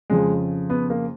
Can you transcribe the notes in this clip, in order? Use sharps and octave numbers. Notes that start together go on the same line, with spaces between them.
F2 C#3 G#3
B3
A#3